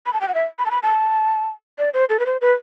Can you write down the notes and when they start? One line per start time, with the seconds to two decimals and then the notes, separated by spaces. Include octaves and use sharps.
0.06 B5
0.13 A5
0.21 G5
0.28 F#5
0.34 E5
0.59 B5
0.66 A5
0.71 B5
0.83 A5
1.78 D5
1.94 C5
2.09 A4
2.19 B4
2.26 C5
2.41 B4